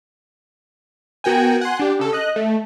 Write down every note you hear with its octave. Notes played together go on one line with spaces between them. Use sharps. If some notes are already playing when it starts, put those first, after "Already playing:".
B3 F#4 A#4 G5 G#5
F#5 G#5 C6
D4 G4
C#3 A4
D#5 F#6
A3